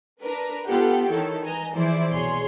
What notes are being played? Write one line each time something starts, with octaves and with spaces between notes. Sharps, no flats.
D4 A#4 B4
B3 F4 G4 A4 F#5 G5
D#3 E3 E4 A4 C#5
B4 D#5 G#5 A#5
E3 F3 E4 G#4 C5 D5
C2 B2 G#4 C#5 C6 C7